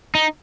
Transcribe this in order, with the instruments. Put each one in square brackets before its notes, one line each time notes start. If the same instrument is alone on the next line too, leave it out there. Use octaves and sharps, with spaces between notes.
[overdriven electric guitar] D#4